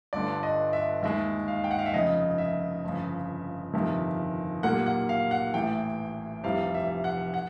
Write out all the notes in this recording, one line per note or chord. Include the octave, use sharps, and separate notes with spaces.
G1 G2 D3 D5
D#5
E5
D#2 D#3 G#3 E5
F5
G5
F#5
F5
E5
F1 F2 C#3 D#5
E5
G1 F2 C#3
G1 F2 C3 D#3
B1 A#2 G3 A#3 F#5
F#5
F5
F#5
A1 A2 E3 G5
F1 F2 C3 E3 G3 F5
E5
F#5
F#5